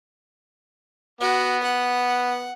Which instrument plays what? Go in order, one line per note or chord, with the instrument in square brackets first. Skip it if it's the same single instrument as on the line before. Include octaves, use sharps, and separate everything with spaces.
[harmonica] B3 [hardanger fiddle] F#4
[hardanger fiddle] F#5